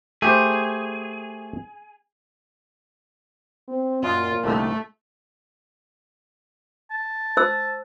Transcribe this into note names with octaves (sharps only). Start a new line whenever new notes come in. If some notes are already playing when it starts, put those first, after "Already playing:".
A3 G4 G#4 C5
C4
F#2 A#2 F4 D#5 F#5
C2 D3 D#3 A3
A5
C5 E6